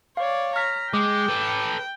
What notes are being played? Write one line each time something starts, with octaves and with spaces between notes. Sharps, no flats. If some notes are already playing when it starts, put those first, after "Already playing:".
C#5 D5 F5
A#5 F6 B6
G#3 G5 D6
A4 B4